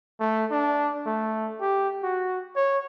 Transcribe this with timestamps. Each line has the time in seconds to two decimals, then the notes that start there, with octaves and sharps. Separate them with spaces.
0.20 A3
0.51 D4
1.06 A3
1.61 G4
2.03 F#4
2.56 C#5